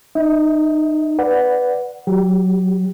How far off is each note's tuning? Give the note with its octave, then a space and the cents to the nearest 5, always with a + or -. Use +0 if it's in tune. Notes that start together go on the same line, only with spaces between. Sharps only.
D#4 -30 E5 -45
B4 +5 D5 +0 F#5 +0
F#3 +0 G4 +0